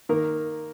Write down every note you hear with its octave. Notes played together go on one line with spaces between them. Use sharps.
D#3 A#3 A#4